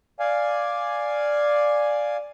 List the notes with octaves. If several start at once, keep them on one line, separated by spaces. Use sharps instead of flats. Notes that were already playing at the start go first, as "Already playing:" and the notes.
D5 F5 G#5